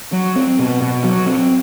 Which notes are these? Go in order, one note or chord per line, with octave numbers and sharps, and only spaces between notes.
F#3
C4
B2
B2
F#3
C4